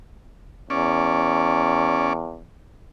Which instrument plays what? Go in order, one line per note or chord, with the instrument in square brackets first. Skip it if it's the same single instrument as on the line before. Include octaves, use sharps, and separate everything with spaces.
[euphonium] E2 [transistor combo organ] C#4 D5